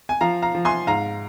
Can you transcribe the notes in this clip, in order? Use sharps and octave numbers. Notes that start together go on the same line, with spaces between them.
G#5
F3 F5 A#5
F5 A#5
F3
G#5 C6
G#2 F5 A#5